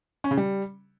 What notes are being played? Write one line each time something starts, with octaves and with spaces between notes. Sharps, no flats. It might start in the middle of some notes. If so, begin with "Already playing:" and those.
C#4
C#3
G3